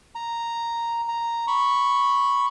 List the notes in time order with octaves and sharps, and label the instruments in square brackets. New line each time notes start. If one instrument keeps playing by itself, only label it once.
[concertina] A#5
A#5
B5 C#6